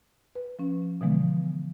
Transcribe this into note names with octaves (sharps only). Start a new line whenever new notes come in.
B4
F3 C#4
B2 D3 E3 F3 G#3 B3